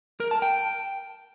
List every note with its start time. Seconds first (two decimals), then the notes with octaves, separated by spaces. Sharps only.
0.20 A#4
0.31 A5
0.42 G5